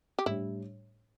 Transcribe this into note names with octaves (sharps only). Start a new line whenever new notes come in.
G4
A2 G3 D4 E4